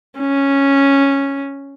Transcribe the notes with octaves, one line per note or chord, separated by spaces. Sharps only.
C#4